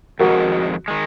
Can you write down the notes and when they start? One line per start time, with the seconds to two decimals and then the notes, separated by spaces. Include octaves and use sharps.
0.19 F2 D#3 G#3 F#4 A#4
0.88 D#3 G#3